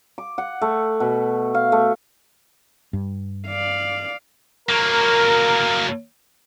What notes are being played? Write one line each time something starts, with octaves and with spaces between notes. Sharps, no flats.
D6
F#5
A3
B2
F5
A3
G2
D5 F5
F#3 A#3 A#4